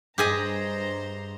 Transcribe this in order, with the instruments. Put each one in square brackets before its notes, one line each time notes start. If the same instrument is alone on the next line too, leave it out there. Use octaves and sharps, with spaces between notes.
[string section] G2 C5 A#5 [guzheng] G4 G#4 D#5